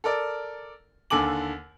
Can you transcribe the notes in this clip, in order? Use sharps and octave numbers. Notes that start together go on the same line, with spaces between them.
A4 A#4 D5
D#2 D3 A4 G#5 D6 F#7